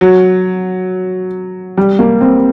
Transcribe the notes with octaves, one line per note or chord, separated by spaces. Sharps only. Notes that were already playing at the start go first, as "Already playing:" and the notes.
F#3
G3
A#3
C4